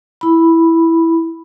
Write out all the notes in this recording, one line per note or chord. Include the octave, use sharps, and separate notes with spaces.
E4 B5